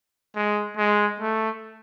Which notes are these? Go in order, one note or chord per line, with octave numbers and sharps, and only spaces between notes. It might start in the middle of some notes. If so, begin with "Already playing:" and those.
G#3
G#3
A3